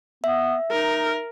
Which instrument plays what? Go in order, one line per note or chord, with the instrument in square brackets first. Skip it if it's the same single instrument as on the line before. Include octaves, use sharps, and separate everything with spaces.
[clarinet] B3 [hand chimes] E5
[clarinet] D#4 [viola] A#4